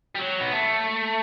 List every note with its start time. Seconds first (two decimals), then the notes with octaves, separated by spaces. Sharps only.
0.15 G3
0.19 F#3
0.41 B3
0.52 A3